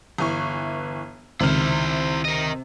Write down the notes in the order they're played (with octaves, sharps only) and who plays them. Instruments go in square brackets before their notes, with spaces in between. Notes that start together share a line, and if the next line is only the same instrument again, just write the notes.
[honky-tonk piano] G1 E3 C#6
[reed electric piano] C#2 D#3 F6 [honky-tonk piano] C3 [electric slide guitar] E4 C5
[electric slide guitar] A#4 D#5